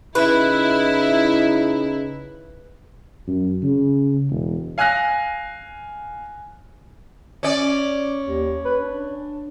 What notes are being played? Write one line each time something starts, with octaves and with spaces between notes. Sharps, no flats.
C#3 D#4 E4 B4
F#2
C#3
E1
F5 G#5 F6 F#6 A#6
C#4 D5
D#2
B4
D4